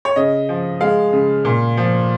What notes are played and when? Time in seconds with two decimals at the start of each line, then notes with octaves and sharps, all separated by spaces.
0.05 C#5
0.16 C#3 D#5
0.49 F3
0.81 G#3 F5
1.13 C#3
1.45 A#2
1.77 F3